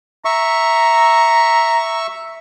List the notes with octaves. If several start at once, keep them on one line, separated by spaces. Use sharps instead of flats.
E5 A#5 C#6